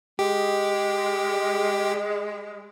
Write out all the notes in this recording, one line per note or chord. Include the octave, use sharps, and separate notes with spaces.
G#3 G4